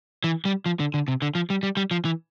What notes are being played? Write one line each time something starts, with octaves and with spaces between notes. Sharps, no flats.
E3
G3
F3
D3
D3
C3
D3
F3
G3
G3
G3
F3
E3